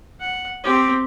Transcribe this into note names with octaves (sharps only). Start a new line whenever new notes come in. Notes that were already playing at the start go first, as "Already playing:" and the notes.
F#5
C4 G4